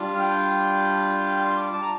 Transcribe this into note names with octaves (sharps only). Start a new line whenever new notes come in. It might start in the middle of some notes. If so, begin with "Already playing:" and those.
Already playing: G3 D4 F4
F5
G5
C6
D6
A5
A#5